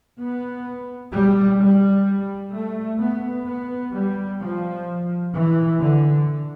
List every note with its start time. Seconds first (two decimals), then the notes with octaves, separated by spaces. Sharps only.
0.18 B3
1.12 G3
1.59 G3
2.52 A3
2.99 B3
3.46 B3
3.93 G3
4.40 F3
5.33 E3
5.80 D3